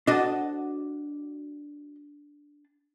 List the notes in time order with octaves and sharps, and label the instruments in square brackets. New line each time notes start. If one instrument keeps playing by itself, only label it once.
[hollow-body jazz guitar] D4 A5 [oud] F#4 D#5